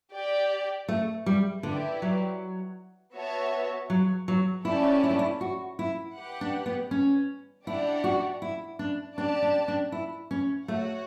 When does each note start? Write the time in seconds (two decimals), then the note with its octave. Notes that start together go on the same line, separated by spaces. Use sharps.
0.13 G4 D5 G5
0.88 A3
1.26 G3
1.63 D3 E4 G4 B4 D5
2.02 F#3
3.15 B3 F#4 C#5 E5 A5
3.90 F#3
4.28 F#3
4.65 A3 C#4 E4 G4 D5 A5
5.04 E4
5.11 D4
5.19 E4
5.41 F#4
5.79 E4
6.17 G4 B4 F#5
6.41 D4
6.66 B3
6.91 C#4
7.67 D4 E4 G4 D5 F#5
8.04 F#4
8.42 E4
8.79 D4
9.17 D4 G4 D5 A5
9.42 D4
9.68 D4
9.92 E4
10.31 C#4
10.68 A3 F#4 C#5 F#5